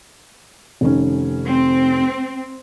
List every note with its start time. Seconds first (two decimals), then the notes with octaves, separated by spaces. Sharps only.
0.81 F1 D#3 C#4
1.47 C4